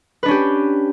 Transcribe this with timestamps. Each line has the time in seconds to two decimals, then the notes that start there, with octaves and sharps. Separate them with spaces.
0.23 B4
0.26 D4
0.28 C#4
0.31 G4